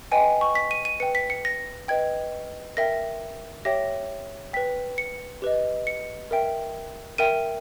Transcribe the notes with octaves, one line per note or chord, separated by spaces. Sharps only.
B4 D#5 G5 G#5
C#6
B6
D#7
D#7
B4 G5 C#7
B6
C#7
A#6
B4 D#5 G5 G#6
A#4 E5 G5 A#6
G4 C#5 E5 G5 A#6
B4 G5 B6
C#7
G4 B4 D#5
C#7
A#4 E5 G5
A#4 E5 G5 D#7